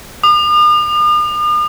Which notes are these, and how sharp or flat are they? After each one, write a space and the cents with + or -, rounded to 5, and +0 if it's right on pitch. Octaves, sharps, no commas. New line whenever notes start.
D#6 -45